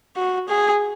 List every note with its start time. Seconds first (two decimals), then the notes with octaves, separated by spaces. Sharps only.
0.16 F#4
0.48 G#4